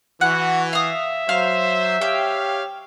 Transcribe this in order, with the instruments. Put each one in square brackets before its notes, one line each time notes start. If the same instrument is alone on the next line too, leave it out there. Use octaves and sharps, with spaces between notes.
[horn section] E3 [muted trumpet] F#4 [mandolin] F#5
[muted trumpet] E5 [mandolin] F5 D#6
[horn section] F#3 C5 [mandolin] F5
[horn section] G4 C#5 F5 [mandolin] G5